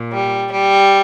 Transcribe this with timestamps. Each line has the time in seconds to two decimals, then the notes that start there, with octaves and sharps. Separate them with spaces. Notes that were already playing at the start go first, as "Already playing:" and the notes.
Already playing: A#2
0.13 G3
0.51 G3